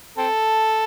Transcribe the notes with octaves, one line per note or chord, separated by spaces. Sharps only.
C4 A4